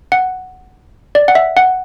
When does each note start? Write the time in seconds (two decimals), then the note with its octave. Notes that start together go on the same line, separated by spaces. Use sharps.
0.12 F#5
1.15 D5
1.28 F#5
1.35 E5
1.57 F#5